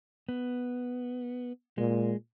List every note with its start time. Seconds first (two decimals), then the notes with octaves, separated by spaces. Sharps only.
0.29 B3
1.78 A#2 G#3